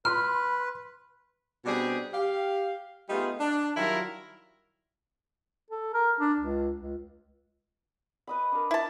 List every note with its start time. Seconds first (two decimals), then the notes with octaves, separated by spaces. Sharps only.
0.05 B4 B5 C6 F6
1.66 B2 G3 C4 D4 G4 G#4
2.14 G4 F5
3.10 G3 A3 B3 D#4 F4 G#4
3.40 D4
3.77 D#3 F#3 G3 E4 F4 A#4
5.71 A4
5.94 A#4
6.20 D4
6.39 C#2
6.81 C#2
8.27 B4 D#5 B5
8.52 D4 A#4
8.71 E4 A5